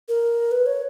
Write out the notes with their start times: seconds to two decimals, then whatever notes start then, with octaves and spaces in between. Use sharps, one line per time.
0.08 A#4
0.51 B4
0.66 C#5